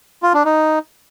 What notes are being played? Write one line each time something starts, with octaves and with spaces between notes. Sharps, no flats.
F4
D4
D#4